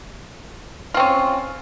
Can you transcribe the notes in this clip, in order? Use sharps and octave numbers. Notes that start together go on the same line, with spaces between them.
C4 C#4 F4